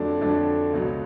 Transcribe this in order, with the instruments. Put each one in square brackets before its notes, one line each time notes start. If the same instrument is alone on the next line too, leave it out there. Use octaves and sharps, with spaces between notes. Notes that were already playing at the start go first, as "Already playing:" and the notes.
Already playing: [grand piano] F2 D3 F#3 A3 D4
F2 D3 F#3 A3 D4
C#2 B2 F#3